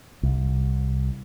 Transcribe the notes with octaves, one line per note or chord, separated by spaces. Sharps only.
C2